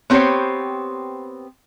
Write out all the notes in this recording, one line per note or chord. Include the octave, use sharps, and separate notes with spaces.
B3 C4 G4 A4 C5 C#5